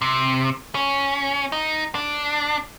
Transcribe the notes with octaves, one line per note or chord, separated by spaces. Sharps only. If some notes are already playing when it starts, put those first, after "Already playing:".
C3
C#4
D#4
D4